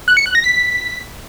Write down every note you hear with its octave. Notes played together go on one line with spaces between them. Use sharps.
F#6
C#7
F#6
A#6
B6